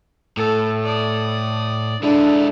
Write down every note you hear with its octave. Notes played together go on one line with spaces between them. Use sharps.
A2 A4
D5 D#6
G#3 D4 E4 A4